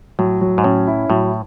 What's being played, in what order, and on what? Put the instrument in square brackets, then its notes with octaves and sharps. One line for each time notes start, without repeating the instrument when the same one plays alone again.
[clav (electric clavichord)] A2 [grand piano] F#3
[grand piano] F#3
[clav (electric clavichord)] G#2
[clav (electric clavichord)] A2 [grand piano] C#4
[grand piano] E4
[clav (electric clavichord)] A2 [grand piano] F#3